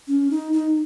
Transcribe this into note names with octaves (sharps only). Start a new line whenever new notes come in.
C#4
D#4
D#4